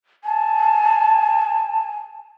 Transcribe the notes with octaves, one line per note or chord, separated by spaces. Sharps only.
G#5 A5